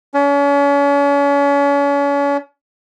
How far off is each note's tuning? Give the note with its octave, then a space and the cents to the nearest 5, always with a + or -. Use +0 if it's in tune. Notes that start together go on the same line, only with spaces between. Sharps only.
C#4 +40